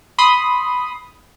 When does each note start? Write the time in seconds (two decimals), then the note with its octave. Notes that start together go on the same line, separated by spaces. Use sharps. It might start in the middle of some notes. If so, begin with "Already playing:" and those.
0.18 B5 C6 D#6